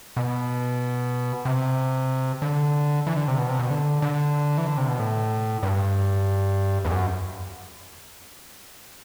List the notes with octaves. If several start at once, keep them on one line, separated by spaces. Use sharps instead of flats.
B2
C3
D3
E3
D3
C3
B2
C3
B2
D3
D3
E3
D3
C3
B2
A2
G2
E2
F#2